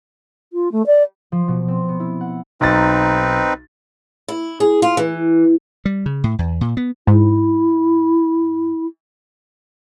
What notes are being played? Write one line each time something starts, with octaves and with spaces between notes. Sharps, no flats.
F4
A3
D5
F3
B2
C4
B3
E4
F#5
B1 C4 D#4 B4 A6
E4
G#4
F4
E3
G3
C#3
A2
E2
A#2
B3
G#2 E4